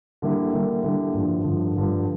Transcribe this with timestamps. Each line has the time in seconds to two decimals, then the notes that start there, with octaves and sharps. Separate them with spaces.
0.22 D3 G3 A#3 E4
0.52 D3 G3 A#3 E4
0.83 D3 G3 A#3 E4
1.14 G2 D3 F3
1.44 G2 D3 F3
1.76 G2 D3 F3